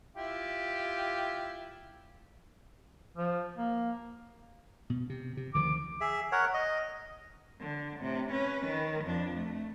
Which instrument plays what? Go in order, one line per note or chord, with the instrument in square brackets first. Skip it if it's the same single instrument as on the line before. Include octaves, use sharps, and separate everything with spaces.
[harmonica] E4 F4 G4
[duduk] F3
A#3
[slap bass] B2
C3
C3
[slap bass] D2 D#3 F3 [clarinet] D6
[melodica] G#4 E5
A#4 C#5 F#5
D#5
[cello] D3
A2 C3
C#4 B4
D#3
F2 D4
A3